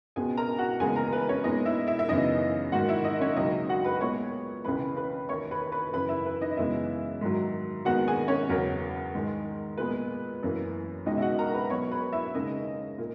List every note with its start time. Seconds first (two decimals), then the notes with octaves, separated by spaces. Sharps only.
0.16 C#2 B2 G#3 B3 G#4 G#5
0.37 A#4 A#5
0.58 F#4 F#5
0.80 D#2 C#3 E3 G#3 B3 G#4 G#5
0.96 A#4 A#5
1.13 B4
1.29 C#4 C#5
1.44 A#2 G#3 B3 D#4 D#5
1.65 E4 E5
1.87 E4 E5
1.99 E5
2.09 F#2 C#3 E3 B3 D#4 D#5
2.72 G#2 D#3 A#3 F#4 F#5
2.89 E4 E5
3.05 D#4 D#5
3.20 C#4 C#5
3.36 C#2 C#3 F#3 A#3 D#4 D#5
3.69 F#4 F#5
3.84 B4 B5
4.01 A#2 G#3 B3 C#5 C#6
4.65 C#2 C#3 E3 G#3 B4 B5
4.97 B4 B5
5.29 D#2 D#3 A#3 C#5 C#6
5.51 B4 B5
5.72 B4 B5
5.93 F#2 C#3 E3 B4 B5
6.09 E4 E5
6.26 B4
6.41 D#4 D#5
6.57 F#2 C#3 E3 G#3 B3 E4 E5
7.21 G#2 D#3 F#3
7.85 D#2 D#3 G#3 B3 F#4 F#5
8.08 G#4 G#5
8.28 C#4 C#5
8.49 E2 C#3 F#3 B3 A#4
9.15 G#2 D#3 G#3
9.78 A#2 G#3 B3 B4
10.43 F#2 E3 A#3
11.06 C#2 B2 G#3 D#4 D#5
11.18 E5
11.22 F#4 F#5
11.38 A#4 A#5
11.54 B4 B5
11.70 B2 F#3 B3 C#5 C#6
11.91 B4 B5
12.13 E4 E5
12.34 D#2 C#3 G#3 D#4 D#5
12.98 A#2